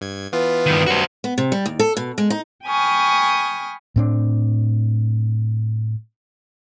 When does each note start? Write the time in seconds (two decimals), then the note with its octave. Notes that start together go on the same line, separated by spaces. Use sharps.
0.01 G2 G#6
0.32 E3 B3 F4 B4
0.66 G2 D#3
0.87 F#2 G3 F#4 C5
1.24 B3
1.38 C3
1.52 G3
1.66 D#2
1.79 A4
1.97 B2
2.18 G#3
2.30 D#4
2.65 G5 G#5 B5 C#6 D#6 F6
3.96 A2 C4 D4